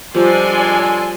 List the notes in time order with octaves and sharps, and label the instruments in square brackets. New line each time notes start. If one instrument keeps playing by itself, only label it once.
[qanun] F3 G3 [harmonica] G#3 D4 A4 [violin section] D5 G#5 C6